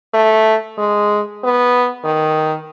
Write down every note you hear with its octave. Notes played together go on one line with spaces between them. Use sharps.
A3
G#3
B3
D#3